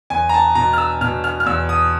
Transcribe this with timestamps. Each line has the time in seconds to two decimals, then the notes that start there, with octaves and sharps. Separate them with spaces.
0.10 E2 G#5
0.29 A#5
0.34 A5
0.55 B2 A#5
0.73 F6
0.78 E6
1.01 B2 F6
1.24 F6
1.40 F6
1.46 E2 E6
1.69 D#6